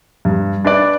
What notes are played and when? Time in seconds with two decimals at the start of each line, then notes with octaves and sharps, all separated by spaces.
0.25 G2
0.65 D4 B4 D5